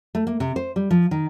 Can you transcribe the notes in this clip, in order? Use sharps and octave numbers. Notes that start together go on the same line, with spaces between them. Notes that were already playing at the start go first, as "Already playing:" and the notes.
A3
A#3
C3
C5
G3
F3
D#3